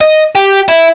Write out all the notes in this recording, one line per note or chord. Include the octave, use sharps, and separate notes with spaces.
D#5
G4
E4